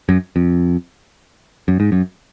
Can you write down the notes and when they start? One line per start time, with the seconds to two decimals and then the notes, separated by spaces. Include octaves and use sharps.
0.09 F#2
0.36 F2
1.68 F#2
1.80 G#2
1.92 F#2